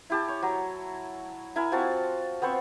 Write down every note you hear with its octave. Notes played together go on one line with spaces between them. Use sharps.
E4 G4 A5
C#5
F#3
E4 A#4 G#5
C4 F4 F#4 A5
B3 C4 C5 C#6